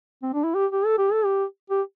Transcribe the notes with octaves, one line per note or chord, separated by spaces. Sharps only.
C4
D4
E4
G4
G4
A4
G4
A4
G4
G4